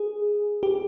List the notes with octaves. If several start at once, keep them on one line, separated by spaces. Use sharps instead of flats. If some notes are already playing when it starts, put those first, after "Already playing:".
Already playing: G#4
G4